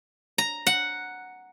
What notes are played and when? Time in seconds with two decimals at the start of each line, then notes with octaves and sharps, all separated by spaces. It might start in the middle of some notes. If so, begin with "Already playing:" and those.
0.38 A#5
0.67 F#5